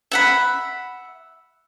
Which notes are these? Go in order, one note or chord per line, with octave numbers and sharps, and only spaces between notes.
E5 F#5 B5